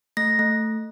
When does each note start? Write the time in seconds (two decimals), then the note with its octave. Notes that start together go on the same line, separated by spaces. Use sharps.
0.17 A3 A#6
0.39 A3